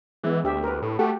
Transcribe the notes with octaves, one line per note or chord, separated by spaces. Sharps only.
E3 G#3 B3
D2 D4 G4 E5
A#4 B4
A2
A3 F#4 G4 F#5